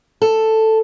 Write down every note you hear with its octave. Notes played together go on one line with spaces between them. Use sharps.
A4